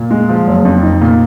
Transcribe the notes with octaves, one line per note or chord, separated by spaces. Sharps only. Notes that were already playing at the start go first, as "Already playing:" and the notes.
Already playing: A#2
G#3
F3
F#1
F2
D#4
A#2